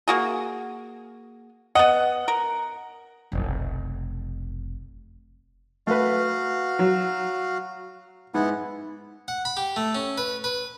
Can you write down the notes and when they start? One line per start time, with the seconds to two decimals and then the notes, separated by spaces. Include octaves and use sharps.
0.08 A#3 F#4 G#4
1.75 B3 D#5 F#5
2.28 A#4
3.32 F1 B1
5.87 A3 F#4 B4 F5
6.79 F#3
8.34 G#2 B3 E4 F#5
9.28 F#5
9.45 B5
9.57 G4
9.76 A3
9.95 C#4
10.18 B4
10.44 B4